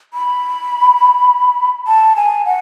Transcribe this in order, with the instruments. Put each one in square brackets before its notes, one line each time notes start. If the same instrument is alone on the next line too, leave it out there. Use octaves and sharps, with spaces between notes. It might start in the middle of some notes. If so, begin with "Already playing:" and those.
[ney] B5
A5
G#5
F#5